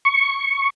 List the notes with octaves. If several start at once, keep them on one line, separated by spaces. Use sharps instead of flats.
C#6